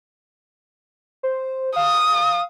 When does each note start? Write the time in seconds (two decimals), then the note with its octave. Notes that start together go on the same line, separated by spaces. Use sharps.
1.23 C5
1.76 F5 D#6